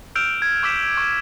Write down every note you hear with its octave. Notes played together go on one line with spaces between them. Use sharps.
E6 F6 G6 D7 E7 F7
G#6
C#6 D6 E6 F6 B6 E7
C#6